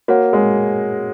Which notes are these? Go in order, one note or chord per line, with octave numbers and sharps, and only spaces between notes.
A#3 F#4 C#5 F#5
G#3